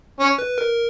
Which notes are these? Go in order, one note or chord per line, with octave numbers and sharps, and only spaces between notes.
C#4
B4
A#4